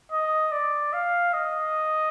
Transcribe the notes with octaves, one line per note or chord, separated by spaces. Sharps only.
D#5
D5
F5
D#5